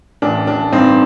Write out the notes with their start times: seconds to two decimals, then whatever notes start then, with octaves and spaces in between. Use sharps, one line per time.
0.22 A1 D4
0.47 A1 D4
0.72 G2 C4 D#4